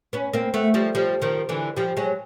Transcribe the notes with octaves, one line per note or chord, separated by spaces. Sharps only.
B3 C#4
A#3 C4
A3 B3
F3 G3
F3 G3
D#3 F3
D3 E3
F3 G3
F#3 G#3